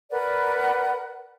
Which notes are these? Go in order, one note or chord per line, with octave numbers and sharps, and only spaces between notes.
A#4 B4 D5 F#5